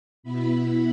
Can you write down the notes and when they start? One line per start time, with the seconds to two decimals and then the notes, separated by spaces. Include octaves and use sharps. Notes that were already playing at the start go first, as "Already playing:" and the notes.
0.23 B2 B3 E4 B5